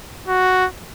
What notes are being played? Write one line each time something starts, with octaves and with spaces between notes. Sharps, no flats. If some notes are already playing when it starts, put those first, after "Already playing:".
F#4